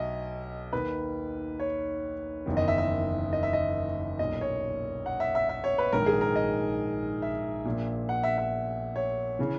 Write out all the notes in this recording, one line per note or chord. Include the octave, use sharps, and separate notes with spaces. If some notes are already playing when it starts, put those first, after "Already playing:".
Already playing: B1 B2 D#5 E5
D#2 D#3 B4
C#5
F#1 E2 D#3
D#5
E5
E5
D#5
E5
D#5
B1 A#2 D#5
C#5
F#5
E5
E5
E5
C#5
B4
A#1 G#2 D#3 A#4
G#4
A#4
D#5
E5
A#1 A#2
F#5
E5
E5
C#5
C#3 E3